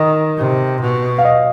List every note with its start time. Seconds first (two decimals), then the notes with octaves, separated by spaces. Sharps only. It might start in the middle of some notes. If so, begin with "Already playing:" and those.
Already playing: D#3 D#5
0.37 C3
0.81 B2
1.18 F5
1.25 D#5